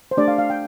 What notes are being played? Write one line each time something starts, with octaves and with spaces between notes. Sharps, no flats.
C5
A3 D4 G4 D5
F5
F5
G5